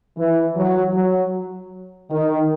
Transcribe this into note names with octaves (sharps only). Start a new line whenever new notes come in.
E3
F#3
F#3
D#3